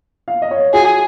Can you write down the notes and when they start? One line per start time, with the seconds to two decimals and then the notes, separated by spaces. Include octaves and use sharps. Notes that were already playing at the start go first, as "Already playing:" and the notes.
0.28 F5
0.42 D#5
0.51 C#5
0.73 F#4 G#4